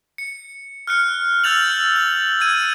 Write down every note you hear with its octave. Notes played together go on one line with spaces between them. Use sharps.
C#7
F6 F#6 C#7
E6 F6 G6 A6 F7 F#7
F#7
E6 G#6 D#7